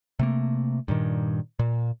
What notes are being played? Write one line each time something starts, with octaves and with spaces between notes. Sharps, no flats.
C3 A3 A#3
G2 A#2 D#3
A#2